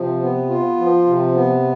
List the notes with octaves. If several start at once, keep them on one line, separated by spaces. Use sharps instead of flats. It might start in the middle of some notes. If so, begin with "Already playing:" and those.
Already playing: C3 F3
B3
F4
F3
C3
B3